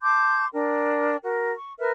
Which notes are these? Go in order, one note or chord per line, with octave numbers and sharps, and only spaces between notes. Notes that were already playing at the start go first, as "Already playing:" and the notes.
A5 C6 D6 G6
D4 A#4 G5
F#4 A#4
C#6
A#4 B4 E5 F6